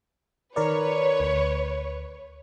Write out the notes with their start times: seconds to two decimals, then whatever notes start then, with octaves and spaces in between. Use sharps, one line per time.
0.56 D#3 A#4 B4 C#5 D5
1.20 D2